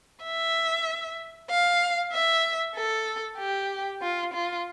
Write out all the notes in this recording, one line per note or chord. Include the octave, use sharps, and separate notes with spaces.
E5
F5
E5
A4
G4
F4
F4